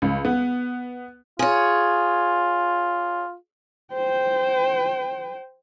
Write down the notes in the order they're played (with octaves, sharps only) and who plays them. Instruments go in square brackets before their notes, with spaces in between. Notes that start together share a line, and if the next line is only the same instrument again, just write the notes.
[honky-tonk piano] C#2
B3
[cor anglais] F4 [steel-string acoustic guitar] G#4 C#5
[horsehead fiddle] C5 G5